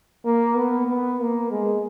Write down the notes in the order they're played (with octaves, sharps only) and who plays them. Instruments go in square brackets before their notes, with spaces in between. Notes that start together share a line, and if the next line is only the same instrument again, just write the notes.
[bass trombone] A#3
B3
B3
A#3
G#3